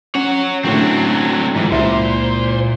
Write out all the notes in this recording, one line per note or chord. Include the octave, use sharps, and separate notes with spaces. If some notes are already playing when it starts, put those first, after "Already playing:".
C#4 C#5 F#5
A2 D3 F#3 C4 D4
G#2 E3 F3
C#2 A#2 E4 C5